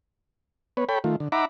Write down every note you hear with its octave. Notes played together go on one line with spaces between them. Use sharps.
B3 B4 C#5
A4 C#5 G5 B5
D#3 A3 F4
D3
D#4 E5 F#5 A#5 B5 D6